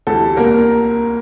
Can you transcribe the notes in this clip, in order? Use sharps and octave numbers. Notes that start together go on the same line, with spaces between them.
D2 C3 E3 A4
C2 A#2 A#3 A#4